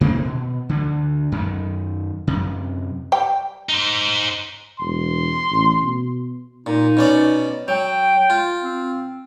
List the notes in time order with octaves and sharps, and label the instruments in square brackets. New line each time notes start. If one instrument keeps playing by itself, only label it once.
[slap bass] C3 D#3 A#3 C4
B2
D2 D3
F#2 D#3
F#2 C3
[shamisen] G3 G5
[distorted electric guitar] D#4 C5
[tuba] E1 [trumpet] C6
[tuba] A1
B2
[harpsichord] A#2 [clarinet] D#4
[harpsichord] B2 C#4 D5
[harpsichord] F#3 [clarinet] G5
[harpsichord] F4
[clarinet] C4